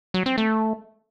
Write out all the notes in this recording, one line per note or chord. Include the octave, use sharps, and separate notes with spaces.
F#3
C4
A3